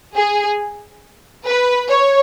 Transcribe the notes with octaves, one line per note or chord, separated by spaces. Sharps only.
G#4
B4
C#5